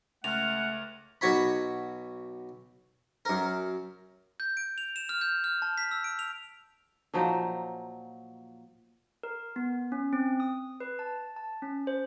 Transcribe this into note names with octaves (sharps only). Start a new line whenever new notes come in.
C#2 A3 F#5 F6 F7
B1 F#4 C#5 B5
F#2 A#4
G6
D7
F7
E7
F6
G6
F6
A5
B6
E6
D7
F7
A#2 F3 F#3 D#4
A#4
B3
C#4
C4
D#6
B4
A5
A5
C#4
C5